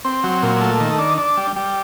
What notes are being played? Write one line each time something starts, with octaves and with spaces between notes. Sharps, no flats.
C4
F#3
A#2
A3
D#3
D4
D4
G3
G3